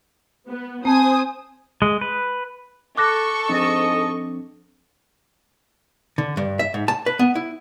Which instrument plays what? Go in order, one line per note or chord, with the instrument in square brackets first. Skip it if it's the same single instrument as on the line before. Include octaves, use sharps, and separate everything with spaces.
[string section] B3
[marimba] C4 A5 [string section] C5 G#5 D#6
[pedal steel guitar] G#3
B4
[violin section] A4 C#6 [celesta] D6 F#6 A#6
[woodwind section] G#2 D#5 [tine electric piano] F3 C4 D4
[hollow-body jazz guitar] D3
G2
E5
G#2
A5
B4
B3
E4